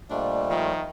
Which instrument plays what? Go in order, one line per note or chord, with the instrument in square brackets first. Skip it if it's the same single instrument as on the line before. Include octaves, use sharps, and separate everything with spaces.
[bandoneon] A#2 G3 A3 [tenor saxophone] D4 [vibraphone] C5 D#5 F5
[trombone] D#3 [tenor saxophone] F3 [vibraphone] D#5 E5